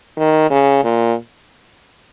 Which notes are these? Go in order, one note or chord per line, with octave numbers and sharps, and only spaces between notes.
D#3
C#3
A#2